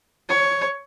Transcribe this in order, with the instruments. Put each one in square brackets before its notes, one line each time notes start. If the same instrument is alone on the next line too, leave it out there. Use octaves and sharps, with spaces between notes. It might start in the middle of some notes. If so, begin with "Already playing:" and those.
[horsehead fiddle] C#5